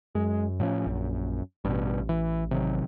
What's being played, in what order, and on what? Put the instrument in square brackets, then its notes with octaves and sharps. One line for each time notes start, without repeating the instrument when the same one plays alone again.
[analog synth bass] F#2 [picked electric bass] G#3
[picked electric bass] A2 F3 C#4
[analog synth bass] A#1 [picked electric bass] F#2
[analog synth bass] A1 [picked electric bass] G2 B2
[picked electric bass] E3
C3 D#3 F#3